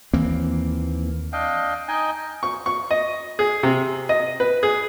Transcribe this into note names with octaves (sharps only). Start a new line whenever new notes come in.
D#2 E3 A#3 C4
D4 D#5 F5 G5
D#4 D#5 G5 G#5
C#6
C#6
D#5
G#4
C3
D#5
B4
G#4